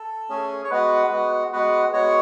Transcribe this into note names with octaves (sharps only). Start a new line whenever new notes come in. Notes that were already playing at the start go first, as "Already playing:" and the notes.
Already playing: A4
A3 C#4 G#4
C#5
G#3 B3 F#4 B4
G#3 B3 F#4
G#3 B3 F#4 B4
G#3 B3 F#4 C#5